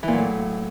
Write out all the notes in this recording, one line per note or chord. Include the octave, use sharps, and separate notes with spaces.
E3
A#2
F#3
A2